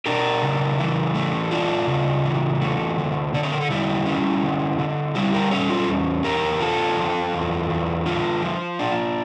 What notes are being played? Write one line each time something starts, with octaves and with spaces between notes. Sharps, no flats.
D4 G4 A#4
C#3
E3
A3
D4 F4
C#3
E3
A3
D3
D3 D5
C#5
A#4
A4
G3 E4 G4
C#4
D3
D3
G3 E4 G4
G4 A#4
C#4 A4 C#5
F4 A4
E2
E2 G4 A#4
D3 F4 A4
F3
E2
E2
D3 F4
F3
D4